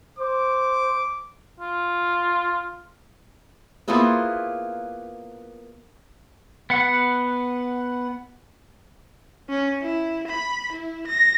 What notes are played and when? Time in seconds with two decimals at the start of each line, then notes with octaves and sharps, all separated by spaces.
0.19 C5 D6
1.60 F4
3.88 A#3 B3 E4 F4 G#4 C5
6.70 B3 F#5
9.50 C#4
9.82 E4
10.28 B5
10.72 E4
11.07 A#6